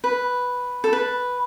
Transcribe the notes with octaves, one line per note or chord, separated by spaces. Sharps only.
B4
A4
B4